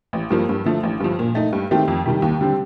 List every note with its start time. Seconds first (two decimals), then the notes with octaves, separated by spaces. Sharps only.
0.13 A1
0.30 G2 F3 A#3
0.49 G2
0.66 D3 F3 A3
0.83 A1
1.00 G2 F3
1.19 A#2
1.35 A3 D#4
1.53 G2
1.71 D#3 A3 C4 G4
1.88 F2
2.06 C3 D#3 G3
2.22 D#2
2.41 D3 G3 C4